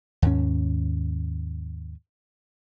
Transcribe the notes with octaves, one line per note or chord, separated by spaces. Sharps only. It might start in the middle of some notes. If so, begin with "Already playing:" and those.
D#2 G#2 C#4